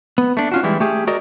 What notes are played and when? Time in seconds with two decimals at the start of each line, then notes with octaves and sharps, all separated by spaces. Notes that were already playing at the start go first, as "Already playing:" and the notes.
0.18 B3
0.37 A3 D4
0.51 C#4 F4 F#4
0.63 E3 G3 G#3 E4
0.80 A3 G4 G#4
1.07 F#4 G#4 A#4 D5 D#5